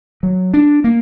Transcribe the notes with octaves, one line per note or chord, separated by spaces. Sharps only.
F#3
D4
A#3